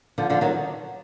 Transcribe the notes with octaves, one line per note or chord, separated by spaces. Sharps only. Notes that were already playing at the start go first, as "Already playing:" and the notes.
D3 F3
D3 F3
D#3 F#3